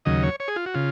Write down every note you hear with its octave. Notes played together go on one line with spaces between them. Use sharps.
D#2 C#3 F#3 D#5
C#5
C#5
G#4
F4
F#4
C#3 F4